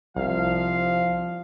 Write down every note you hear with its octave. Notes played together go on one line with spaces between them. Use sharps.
C2 F3 F5